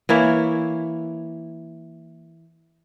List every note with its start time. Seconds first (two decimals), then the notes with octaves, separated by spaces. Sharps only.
0.09 E3 A#3 E4 C#5